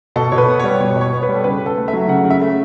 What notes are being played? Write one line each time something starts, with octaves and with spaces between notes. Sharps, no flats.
B2 A4
B2 C#5
B4
B3
G3 C#5
B2 C#5
B2
C#5
B3
B4
G3
A4
C#3 B4
C#3
A4
A3
E5
F#3
C#3 F#5
C#3
E5
A3